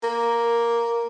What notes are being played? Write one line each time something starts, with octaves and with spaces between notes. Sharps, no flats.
A#3